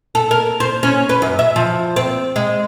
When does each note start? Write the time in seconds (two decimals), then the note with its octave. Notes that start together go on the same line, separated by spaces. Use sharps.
0.15 A4
0.31 A#4
0.60 C5
0.83 C#4
1.09 B4
1.22 F#2
1.39 E5
1.56 F3
1.96 C4
2.36 G#3